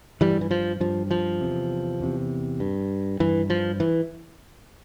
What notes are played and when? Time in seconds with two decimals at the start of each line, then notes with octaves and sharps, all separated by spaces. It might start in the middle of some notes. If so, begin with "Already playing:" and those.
0.21 G2 E3 G3
0.41 E3
0.51 F3
0.80 G2 F3
1.11 F3
1.41 E2 C3
2.00 E2 C3
2.60 G2
3.20 G2 E3
3.50 F3
3.80 E3